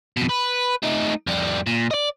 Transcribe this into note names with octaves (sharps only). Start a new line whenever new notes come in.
F2 B2
B4
A3 D#4
F2 G3
A#2
D5 D#5